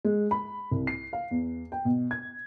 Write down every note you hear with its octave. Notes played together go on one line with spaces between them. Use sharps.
G#3
B5
C2
C7
F5
E2
G5
B2
G#6